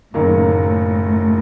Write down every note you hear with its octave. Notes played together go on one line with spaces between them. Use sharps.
F#1 F#2 A2 D#3 F#3 A#3